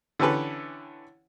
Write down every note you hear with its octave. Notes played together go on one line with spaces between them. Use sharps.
D3 E3 C#4 G4 A4 B4